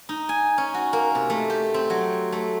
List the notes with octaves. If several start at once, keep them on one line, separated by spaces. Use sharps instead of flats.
D#4
G#5
C#4
F#4
A#3
C3
A3
G4
C4
F#3
A3